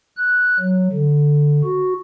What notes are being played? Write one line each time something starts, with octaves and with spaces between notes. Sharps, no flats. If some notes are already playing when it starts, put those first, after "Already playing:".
F#6
F#3
D3
F#4